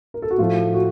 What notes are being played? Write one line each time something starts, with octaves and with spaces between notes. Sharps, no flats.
A#4
A4
F#4
A2 F3 A3 F4
F#4